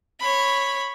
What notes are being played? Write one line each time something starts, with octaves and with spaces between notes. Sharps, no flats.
C#5 B5